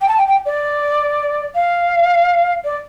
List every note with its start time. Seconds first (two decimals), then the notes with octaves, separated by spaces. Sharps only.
0.02 G5
0.08 A5
0.18 G5
0.28 G5
0.46 D5
1.55 F5
2.65 D5